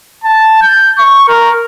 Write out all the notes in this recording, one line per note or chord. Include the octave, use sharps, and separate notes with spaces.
A5
G6
C#6
A#4